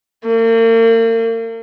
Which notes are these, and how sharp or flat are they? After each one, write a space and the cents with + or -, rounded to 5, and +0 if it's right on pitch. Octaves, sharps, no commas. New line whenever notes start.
A#3 -40